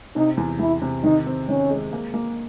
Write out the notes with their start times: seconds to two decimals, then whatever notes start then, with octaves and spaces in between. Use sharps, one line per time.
0.16 C3 D#4
0.37 E2
0.59 E2 E4
0.82 C3
1.04 D#3 D#4
1.27 C4
1.48 D#3 C#4
1.70 G#3
1.93 A#3
2.14 A#3